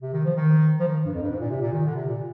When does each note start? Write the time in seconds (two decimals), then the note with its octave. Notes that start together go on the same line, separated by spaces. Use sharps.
0.02 C3
0.13 D#3
0.25 F3
0.36 D#3
0.79 F3
0.88 D#3
1.06 G2
1.14 F2
1.22 G2
1.31 G#2
1.40 A#2
1.51 C3
1.62 A#2
1.73 D#3
1.86 D3
1.96 C3
2.09 A#2